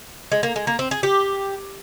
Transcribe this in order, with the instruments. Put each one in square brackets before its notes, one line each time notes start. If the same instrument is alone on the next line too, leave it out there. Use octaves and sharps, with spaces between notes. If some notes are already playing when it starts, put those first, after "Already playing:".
[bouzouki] G#3
A#3
G#3
A#3
C4
G#4
G4